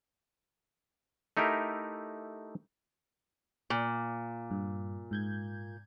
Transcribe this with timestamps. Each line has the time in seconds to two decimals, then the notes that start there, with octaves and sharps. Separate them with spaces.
1.37 A3 D#4 E4 G4 A#4
3.70 A#2
4.51 G2
5.11 G#2 G6 G#6